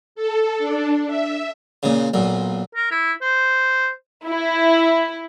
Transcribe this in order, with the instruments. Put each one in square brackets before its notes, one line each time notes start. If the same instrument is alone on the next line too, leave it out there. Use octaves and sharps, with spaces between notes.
[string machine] A4
D4
E5
[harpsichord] A#2 C#3
B1 A#2
[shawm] A#4
E4
C5
[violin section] E4